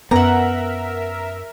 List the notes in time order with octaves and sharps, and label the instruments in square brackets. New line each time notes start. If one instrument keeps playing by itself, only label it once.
[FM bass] F#2 [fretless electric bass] B3 [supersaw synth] A#4 E5 [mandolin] F#5 A#5